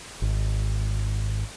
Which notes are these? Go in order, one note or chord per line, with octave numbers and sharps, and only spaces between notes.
G#1